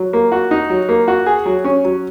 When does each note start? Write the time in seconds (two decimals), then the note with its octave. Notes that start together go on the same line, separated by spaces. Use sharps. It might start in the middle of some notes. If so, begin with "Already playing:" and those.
Already playing: F#3
0.13 A#3
0.32 F#4
0.51 D#4
0.70 F#3
0.89 A#3
1.08 F#4
1.26 G#4
1.46 F#3
1.64 C#4
1.84 F#3